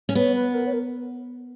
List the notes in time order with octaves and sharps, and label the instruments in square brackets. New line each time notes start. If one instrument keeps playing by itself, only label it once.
[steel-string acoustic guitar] C#4
[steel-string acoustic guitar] B3 [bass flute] C#5
[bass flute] B4
A#4
C#5
A#4